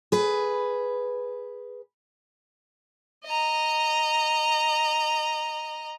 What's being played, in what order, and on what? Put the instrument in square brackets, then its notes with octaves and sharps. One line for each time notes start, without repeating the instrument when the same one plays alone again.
[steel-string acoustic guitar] G#4 B4
[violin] D#5 A#5